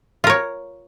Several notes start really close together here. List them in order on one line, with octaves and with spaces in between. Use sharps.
F4 A#4 C#5